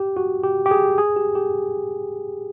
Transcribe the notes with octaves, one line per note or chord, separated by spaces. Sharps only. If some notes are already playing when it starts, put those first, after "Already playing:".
Already playing: G4
F#4
G4
G4
G#4
G#4
G4
G4